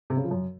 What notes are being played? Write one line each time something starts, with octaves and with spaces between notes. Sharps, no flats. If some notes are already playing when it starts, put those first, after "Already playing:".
C3
C#3
F3
F#2